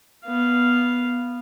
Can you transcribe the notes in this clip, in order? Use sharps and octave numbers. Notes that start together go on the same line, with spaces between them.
B3 F5